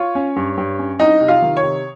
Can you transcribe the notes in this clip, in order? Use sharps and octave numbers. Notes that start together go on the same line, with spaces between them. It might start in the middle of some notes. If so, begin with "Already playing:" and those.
Already playing: F4 C#5
C#4
G2
G2
C#4
C2 D#4 D#5
C3
F4 F5
D#3
C#5
C3